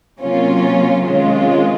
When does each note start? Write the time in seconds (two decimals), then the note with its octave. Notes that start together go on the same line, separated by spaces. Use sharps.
0.21 C3 F#3 A#3 C#4 F4
1.04 C3 D#3 G#3 C#4 F4